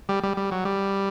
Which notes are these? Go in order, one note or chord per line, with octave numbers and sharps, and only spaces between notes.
G3
G3
G3
F#3
G3